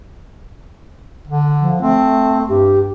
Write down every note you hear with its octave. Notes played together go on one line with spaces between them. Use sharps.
D3
F3
A3 C4
G2 G4